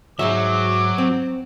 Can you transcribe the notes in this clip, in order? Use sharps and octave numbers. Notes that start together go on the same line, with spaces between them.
G#2 B2 F#3 E5 D6
C4